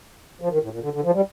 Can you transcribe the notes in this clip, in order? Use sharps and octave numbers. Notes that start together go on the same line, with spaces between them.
F3
D#3
A2
A#2
D3
D3
F3
G3